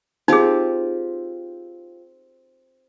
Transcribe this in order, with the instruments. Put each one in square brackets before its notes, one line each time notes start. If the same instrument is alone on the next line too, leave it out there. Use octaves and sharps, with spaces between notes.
[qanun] C4 F4 G4 [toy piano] D#4 G#4